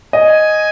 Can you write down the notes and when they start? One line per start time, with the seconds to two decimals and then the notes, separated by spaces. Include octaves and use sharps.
0.13 D#5 G#5